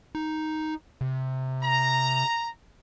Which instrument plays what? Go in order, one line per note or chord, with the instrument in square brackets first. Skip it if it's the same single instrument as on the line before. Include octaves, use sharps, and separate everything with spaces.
[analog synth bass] D#4
C3
[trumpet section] A#5